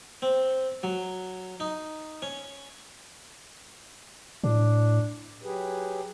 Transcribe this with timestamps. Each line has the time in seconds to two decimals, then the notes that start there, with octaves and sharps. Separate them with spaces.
0.22 C4
0.83 F#3
1.60 D#4
2.22 C#4
4.44 A2 D4
5.43 F#3 G4 G#4 B4